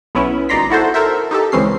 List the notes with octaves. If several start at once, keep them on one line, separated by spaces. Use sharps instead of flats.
B1 B3 C#4 E4
G#1 D#4 D5 A#5 C6 B6
E4 F#4 A4 C5
A4 A#4 C5 E5
D#4 G4 A4
C#2 E3 C4 C#4 C7